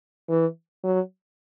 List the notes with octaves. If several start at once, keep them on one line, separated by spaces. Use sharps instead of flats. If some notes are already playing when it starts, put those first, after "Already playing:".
E3
F#3